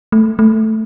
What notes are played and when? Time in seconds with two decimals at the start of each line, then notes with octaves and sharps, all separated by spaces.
0.12 A3
0.39 A3